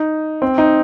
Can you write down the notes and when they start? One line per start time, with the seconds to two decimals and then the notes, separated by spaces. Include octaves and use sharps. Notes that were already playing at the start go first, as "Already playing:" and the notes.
Already playing: D#4
0.42 C4
0.58 D#4